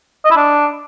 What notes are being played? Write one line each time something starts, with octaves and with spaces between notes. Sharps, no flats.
D#5
E4
D4